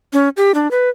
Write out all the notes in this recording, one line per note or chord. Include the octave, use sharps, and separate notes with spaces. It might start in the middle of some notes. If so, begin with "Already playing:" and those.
C#4
G4
D4
B4